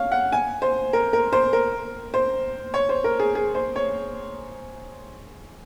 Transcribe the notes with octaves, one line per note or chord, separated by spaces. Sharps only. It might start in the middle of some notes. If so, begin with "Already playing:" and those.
Already playing: C#5 F5
F#5
G#5
C5
A#4
A#4
C5
A#4
C5
C#5
C5
A#4
G#4
G#4
C5
C#5